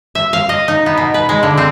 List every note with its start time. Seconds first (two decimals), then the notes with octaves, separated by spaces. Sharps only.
0.15 E5
0.33 F5
0.49 D#5
0.68 D#4
0.86 B3
0.98 B2
1.14 B4
1.29 G#3
1.43 D3
1.57 C4